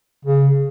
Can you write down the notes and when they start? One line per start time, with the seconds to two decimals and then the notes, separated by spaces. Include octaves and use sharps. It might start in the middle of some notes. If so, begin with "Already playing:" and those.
0.25 C#3